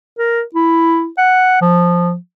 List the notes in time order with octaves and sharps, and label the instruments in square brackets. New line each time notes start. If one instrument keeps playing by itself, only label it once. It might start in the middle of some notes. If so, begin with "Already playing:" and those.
[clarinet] A#4
E4
F#5
F3